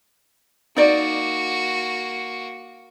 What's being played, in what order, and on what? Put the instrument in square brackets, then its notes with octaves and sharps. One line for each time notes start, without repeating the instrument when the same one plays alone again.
[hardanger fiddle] A#3 F#4 [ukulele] D#4 D5